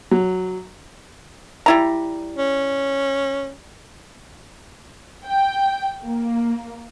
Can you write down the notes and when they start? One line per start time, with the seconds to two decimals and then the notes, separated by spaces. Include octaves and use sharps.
0.11 F#3
1.66 G3 E4 A#5
2.37 C#4
5.26 G5
6.04 A#3